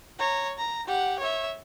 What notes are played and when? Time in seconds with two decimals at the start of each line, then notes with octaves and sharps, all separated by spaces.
0.19 C#5 A#5
0.58 A#5
0.87 G4 F#5
1.19 C#5 E5